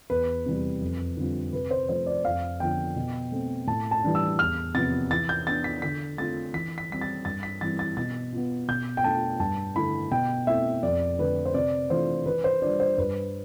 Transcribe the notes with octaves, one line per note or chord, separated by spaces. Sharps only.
E2 B4
C3 E3 G3
F2
D3 G3 C4 F4
C3 B4
C5
F3 A3 C5
D5
F2 F5
D3 F3 B3 G5
B2
A3 C4
A2 A5
A5
E3 G3 D4
E6
E2 F6
C3 F3 B3 A6
E3 A6
G6
B3 D4 A6
B6
D3 B6
A3 C4 F4 A6
E3 B6
B6
G3 C4 B6
A6
G2 A6
B6
E3 G3 C4 E4 A6
A6
B2 A6
B3 F4
B2 G6
G5
A3 D4 F4 A5
G2 A5
D3 A3 E4 B5
B2 G5
A3 C4 E4 E5
F2 D5
D3 A3 B4
C5
C3 D5
E3 A3 D4 F4 C5
E3 B4
C5
G3 D4 F4 D5
C5
G2 B4